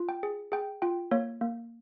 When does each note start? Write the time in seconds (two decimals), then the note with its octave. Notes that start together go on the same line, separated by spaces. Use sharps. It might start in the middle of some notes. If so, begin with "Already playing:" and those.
Already playing: F4
0.09 G5
0.23 G#4
0.52 G#4 G5
0.82 F4 G5
1.11 A#3 C#5
1.41 A#3